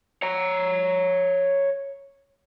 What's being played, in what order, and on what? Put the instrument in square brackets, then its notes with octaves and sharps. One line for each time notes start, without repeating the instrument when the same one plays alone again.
[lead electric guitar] C#5 A#5